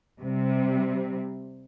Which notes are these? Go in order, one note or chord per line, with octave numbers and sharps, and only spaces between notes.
C3 G3 C4